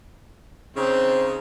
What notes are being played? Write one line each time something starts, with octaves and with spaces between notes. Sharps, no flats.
C#3 C4 D#4